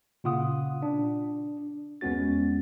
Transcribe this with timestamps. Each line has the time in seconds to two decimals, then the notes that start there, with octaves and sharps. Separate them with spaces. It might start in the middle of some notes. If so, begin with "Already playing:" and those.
0.24 A#2 C#3 F4 F#5 D#6
0.83 D4
2.01 E2 G#3 B3 C#4 F#4 A6